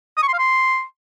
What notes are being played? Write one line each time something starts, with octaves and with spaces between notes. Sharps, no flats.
D#6
C#6
C6
F5
C6